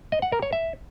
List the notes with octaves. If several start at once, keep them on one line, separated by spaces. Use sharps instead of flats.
D#5
F#5
A#4
C#5
E5